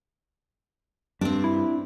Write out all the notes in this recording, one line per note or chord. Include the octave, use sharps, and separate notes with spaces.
G2 C4 D4
E4